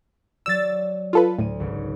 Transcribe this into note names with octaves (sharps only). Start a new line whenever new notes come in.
F#3 D5 E6 A6
F4 A4 B4
D2 A2 D#7
G#1 C#2